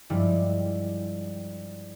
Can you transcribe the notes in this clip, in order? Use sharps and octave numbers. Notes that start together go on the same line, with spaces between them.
G2 F3 G3 G#3 E4